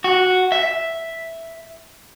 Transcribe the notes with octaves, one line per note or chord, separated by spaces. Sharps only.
F#4
E5